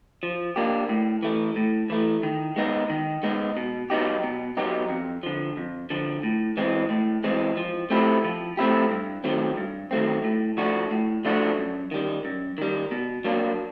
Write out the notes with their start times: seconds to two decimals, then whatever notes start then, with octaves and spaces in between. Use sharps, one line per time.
0.23 F3
0.56 A#3 D4 G4
0.89 A2
1.23 E3 A3
1.56 A2
1.90 E3 A3
2.23 D#3
2.56 G#3 B3 D#4
2.90 D#3
3.23 G#3 B3 D#4
3.57 B2
3.90 F#3 B3 D#4 G4
4.23 B2
4.57 F#3 B3 D#4 G4
4.90 F2
5.23 D3 F3
5.57 F2
5.90 D3 F3
6.23 A2
6.57 E3 G#3 C4
6.90 A2
7.24 E3 G#3 C4
7.57 F3
7.90 A3 C4 E4 G4
8.24 F3
8.57 A3 C4 E4 G4
8.91 G2
9.24 D#3 F#3 A3 C4
9.57 G2
9.91 D#3 F#3 A3 C4
10.24 A2
10.57 F3 A3 D4 F#4
10.91 A2
11.25 F3 A3 D4 F#4
11.58 F#2
11.91 D#3 G3
12.25 F#2
12.58 D#3 G3
12.91 B2
13.24 F#3 A#3 D4